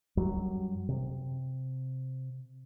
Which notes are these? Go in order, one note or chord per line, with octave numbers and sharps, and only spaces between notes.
F#2 F#3 G3
C3